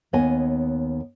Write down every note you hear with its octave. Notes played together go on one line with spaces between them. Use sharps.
D#2 B3 C#5 D#5 G#5